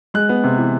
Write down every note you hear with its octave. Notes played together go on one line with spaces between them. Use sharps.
G#3 F#6
B3
C3
E3